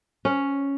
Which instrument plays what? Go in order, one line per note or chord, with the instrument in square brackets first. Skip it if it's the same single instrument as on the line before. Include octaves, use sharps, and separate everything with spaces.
[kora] C#4